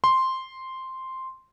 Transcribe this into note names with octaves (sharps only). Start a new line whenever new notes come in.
C6